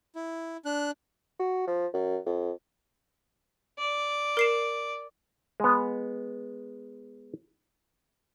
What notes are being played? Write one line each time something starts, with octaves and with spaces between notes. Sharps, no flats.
E4
D4 F#6
F#4
F3
F#2
F2
D5
A#4 C7 E7
G#3 B3